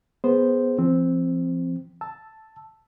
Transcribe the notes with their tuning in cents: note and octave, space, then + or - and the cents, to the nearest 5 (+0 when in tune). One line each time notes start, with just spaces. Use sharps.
B3 +0 G#4 +0 C5 +0
F3 -35 C4 +0
A5 +0 E6 +0